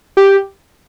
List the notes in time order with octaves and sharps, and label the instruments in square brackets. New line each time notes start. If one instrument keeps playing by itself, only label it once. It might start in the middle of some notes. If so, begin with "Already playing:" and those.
[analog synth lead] G4